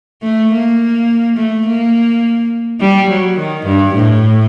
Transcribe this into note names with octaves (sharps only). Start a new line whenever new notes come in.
A3
A#3
A3
A#3
G3
F#3
D#3
G2
A2